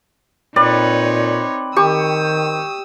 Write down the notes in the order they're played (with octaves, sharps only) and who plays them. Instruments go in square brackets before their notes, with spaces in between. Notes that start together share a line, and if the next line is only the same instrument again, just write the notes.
[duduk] A#2 [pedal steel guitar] C4 B4 [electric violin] D#4 C#5 [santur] D5
[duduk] D#3 [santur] G4 C#6 [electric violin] D#6 E6